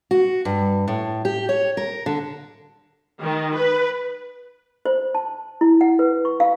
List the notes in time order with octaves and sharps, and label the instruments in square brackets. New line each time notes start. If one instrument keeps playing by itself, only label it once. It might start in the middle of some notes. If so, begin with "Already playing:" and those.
[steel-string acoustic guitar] F#4
G2
A2
G4
C#5
A#4
D3
[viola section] D#3
B4
[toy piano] C5
A5
E4
F#5
B4
C#6
F5